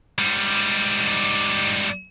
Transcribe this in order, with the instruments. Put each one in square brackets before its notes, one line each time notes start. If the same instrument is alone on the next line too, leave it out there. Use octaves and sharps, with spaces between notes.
[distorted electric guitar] G#2 G3